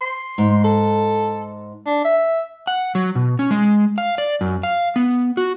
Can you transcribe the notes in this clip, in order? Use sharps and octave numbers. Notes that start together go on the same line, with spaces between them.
C6
G#2
A4
D4
E5
F#5
F#3
B2
C#4
G#3
F5
D5
F#2
F5
B3
F#4